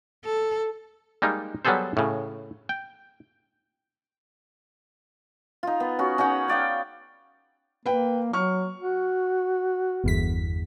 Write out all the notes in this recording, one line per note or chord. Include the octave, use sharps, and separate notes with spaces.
A4
G3 G#3 A#3 D#4
F#3 G3 B3 G#4 A4 C5
A2 C#3
G5
D#4 F4
B3
C#4 F#4
C#4 D#4 G#4 F#5
C#5 D5 F5 G5
A#3 B4 G5
F#3 C#6 F6
F#4
G1 E2 B6